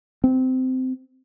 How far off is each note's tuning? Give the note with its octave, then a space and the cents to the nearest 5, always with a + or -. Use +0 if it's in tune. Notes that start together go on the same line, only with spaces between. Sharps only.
C4 -20